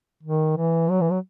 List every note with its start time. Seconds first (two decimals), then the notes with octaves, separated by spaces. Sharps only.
0.23 D#3
0.57 E3
0.90 F#3
1.01 E3
1.11 F#3